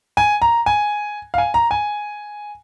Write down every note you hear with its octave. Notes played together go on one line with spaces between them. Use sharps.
G#5
A#5
G#5
F5
G#5
A#5
G#5